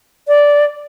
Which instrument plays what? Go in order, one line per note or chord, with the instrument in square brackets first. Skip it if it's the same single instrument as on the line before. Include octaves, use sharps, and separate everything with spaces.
[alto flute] D5